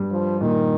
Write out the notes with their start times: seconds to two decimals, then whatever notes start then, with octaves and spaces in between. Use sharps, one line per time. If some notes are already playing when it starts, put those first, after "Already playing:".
Already playing: G2 G3
0.12 F3
0.41 A#2 D#3